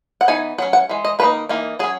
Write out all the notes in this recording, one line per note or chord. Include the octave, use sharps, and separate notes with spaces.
F#5
E3 B3 D#4 G#5
F#3 C#4 F#5
F#5
E3 G#3
D#5
D#3 A#3 D#4 B4
E3 A#3 D#4
F#3 C#4 G#4